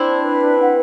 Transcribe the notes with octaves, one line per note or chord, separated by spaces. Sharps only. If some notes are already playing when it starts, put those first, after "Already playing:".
Already playing: C4 D4 E4 C5
B4
F#5